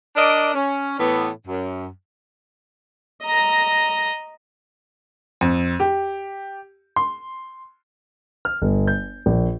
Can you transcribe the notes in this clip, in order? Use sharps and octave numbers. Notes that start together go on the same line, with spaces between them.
D4 A#4 D5 D#5
C#4
A2 E3 B3
F#2
D#5 A#5
F2
G4
C6
F6
G1
G6
A#1